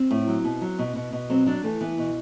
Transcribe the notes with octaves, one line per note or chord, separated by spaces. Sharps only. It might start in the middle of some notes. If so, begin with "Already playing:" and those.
Already playing: C4
A2
F#3
B2
F#3
B2
B2
B2
F#3 C4
F#3 D4
E3 A3
E3 B3
B2